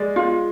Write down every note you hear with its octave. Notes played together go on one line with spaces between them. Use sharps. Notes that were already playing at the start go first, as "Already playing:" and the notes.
Already playing: G#3 D5
F4